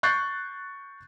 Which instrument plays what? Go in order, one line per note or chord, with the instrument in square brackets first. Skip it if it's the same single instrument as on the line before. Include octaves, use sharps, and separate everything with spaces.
[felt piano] C#6 F#6 G6 A6 C7